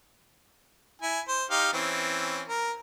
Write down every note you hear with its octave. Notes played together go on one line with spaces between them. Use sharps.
E4 G#5
C5
D#4 G4 F5
E3 C4 C#4
A#4